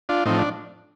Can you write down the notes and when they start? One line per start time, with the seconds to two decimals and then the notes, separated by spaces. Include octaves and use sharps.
0.09 D4 F4
0.25 A2 F3 C4 D#4
0.38 D4